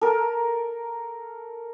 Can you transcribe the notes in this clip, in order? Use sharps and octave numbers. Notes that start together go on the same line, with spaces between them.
A4 A#4